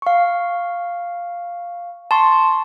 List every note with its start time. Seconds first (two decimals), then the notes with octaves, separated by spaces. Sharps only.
0.02 F5 C#6
2.11 A5 C6 C#6